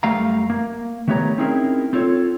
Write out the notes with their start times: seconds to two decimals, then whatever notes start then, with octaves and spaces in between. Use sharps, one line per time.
0.03 F#2 G3 A3 F5 A#5
0.50 A#3
1.08 D#3 A3 B3 G4 C#5 A#5
1.38 C4 C#4 D#4 E4 G#4 A#4
1.93 C4 F4 A4 C#5